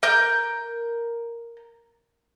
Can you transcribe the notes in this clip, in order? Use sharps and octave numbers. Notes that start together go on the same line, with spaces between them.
A#4 G6